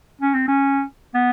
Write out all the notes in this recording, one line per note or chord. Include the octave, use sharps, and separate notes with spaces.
C#4
C4
C#4
B3